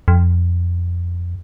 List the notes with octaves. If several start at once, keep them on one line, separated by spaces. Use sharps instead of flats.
F2